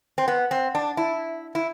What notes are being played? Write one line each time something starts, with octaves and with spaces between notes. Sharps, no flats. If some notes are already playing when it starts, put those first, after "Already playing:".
C4
B3
C4
D4
E4
E4